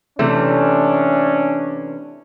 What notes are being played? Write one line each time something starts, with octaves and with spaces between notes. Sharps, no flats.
C3 E3 A3 C#4 D4